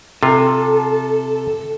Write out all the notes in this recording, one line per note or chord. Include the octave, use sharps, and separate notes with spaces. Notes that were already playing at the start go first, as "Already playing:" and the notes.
C3 F4 A4